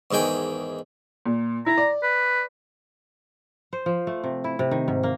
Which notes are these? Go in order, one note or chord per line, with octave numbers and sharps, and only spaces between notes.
E2 G#2 D#3 G5 G#5
A#2
E4 A#5
D5
B4
C5
F3
A3
C3
E4
C3
D#3
G#2
A#3